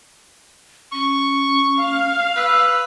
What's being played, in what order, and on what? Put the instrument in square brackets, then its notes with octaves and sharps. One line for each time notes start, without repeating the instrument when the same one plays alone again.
[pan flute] C#4 [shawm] C#6
[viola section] F5
[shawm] B4 [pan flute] E6